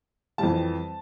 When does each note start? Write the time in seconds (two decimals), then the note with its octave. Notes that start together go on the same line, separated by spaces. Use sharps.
0.38 F2 E3 G3 A5